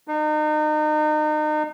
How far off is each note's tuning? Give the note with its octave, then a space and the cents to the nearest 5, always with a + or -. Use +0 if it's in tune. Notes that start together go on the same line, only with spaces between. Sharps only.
D#4 -35